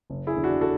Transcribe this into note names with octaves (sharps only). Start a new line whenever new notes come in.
F#1
E4 G#4
E2 D3
D4 F#4
F#4 A4